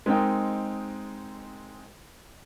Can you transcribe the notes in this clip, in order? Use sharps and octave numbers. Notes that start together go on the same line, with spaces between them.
G#3 C4 D#4 A#4 G5